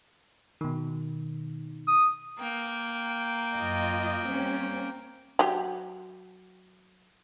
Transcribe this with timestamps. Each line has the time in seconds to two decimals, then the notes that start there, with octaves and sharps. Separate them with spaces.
0.61 B2 D#3
1.88 D#6
2.39 A#3 G5
3.57 F#2 F4 D#5
4.28 G3 C4 C#4
5.39 F#3 G4